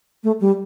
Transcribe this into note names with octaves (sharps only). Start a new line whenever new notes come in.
A3
G3